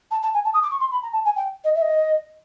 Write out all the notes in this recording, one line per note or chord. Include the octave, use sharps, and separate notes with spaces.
A5
A5
G#5
A5
D#6
D6
C#6
C6
B5
A#5
A5
G#5
G5
D#5
E5
D#5